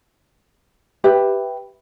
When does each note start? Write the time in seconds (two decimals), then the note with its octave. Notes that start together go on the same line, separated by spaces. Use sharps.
1.04 G4 B4 E5